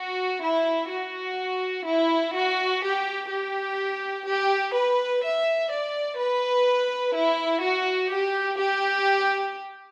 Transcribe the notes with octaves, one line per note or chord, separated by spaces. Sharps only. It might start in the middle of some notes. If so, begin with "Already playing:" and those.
Already playing: F#4
E4
F#4
E4
F#4
G4
G4
G4
B4
E5
D5
B4
E4
F#4
G4
G4